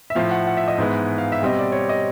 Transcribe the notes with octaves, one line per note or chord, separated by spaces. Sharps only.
E5
A2 F3 A3 F5
F#5
F#5
E5
D#5
G#2 E3 G#3 B3
F5
E5
B2 G3 C4 D#5
D5
C#5
D#5